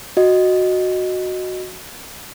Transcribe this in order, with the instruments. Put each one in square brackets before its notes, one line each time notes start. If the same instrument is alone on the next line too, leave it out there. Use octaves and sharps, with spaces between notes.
[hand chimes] F#4 D#5